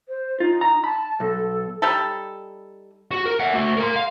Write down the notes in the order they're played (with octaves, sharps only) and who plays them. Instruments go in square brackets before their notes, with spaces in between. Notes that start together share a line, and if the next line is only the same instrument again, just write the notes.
[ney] C5
[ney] D#4 [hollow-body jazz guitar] F4
[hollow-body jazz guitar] A#5
[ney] A5 [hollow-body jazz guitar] B5
[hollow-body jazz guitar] B1 [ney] A4
[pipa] G3 D#4 A4
[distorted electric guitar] F#4
A#4
E5 F#5
A3 F#4
A#4 C6
F5